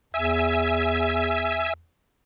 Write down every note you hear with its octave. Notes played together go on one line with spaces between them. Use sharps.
E2 E5 G#5 E6